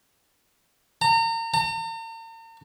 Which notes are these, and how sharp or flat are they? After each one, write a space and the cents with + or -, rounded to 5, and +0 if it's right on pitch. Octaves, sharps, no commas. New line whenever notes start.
A#5 -35
A#5 -45